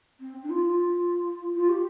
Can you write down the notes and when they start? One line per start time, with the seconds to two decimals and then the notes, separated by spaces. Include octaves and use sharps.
0.20 C4
0.43 D4
0.49 F4
0.64 F4
1.54 F4
1.68 G4